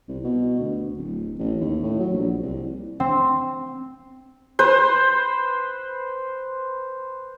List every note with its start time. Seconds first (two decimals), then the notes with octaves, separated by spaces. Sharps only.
0.08 C2
0.24 B2
0.59 D2
0.97 D1
1.39 A1
1.61 D#2
1.83 A2
2.00 F#3
2.12 A#1
2.42 C2
3.00 C4
4.59 B4 C5